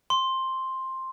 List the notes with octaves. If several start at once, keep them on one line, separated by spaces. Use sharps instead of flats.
C6